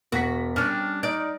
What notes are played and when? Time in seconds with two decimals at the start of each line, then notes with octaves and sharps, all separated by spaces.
0.12 E1 F#4 A#6 B6
0.56 G3 C#4 D4 F6
1.03 D#4 D5